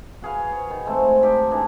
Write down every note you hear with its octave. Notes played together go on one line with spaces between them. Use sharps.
F#4 G#4 B4 F5
C#5
D#3
G#3 A3 C4
D#4 G4 A4
E3 D4 G#4 D5